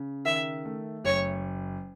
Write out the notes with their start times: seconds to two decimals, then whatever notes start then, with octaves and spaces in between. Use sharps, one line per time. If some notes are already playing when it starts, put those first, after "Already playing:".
Already playing: C#3
0.25 D#3 E5
0.65 A3
1.04 F#1 C#5